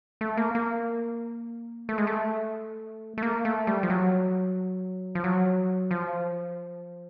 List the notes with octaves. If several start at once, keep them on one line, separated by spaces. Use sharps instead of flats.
A3
A#3
A#3
A3
G#3
A3
A3
A#3
A3
G3
F3
F#3
F3
F#3
F3